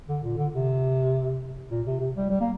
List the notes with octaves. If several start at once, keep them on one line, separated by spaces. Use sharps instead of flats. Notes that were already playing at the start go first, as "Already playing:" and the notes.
D3
A#2
D3
C3
A#2
C3
C3
G3
G3
A#3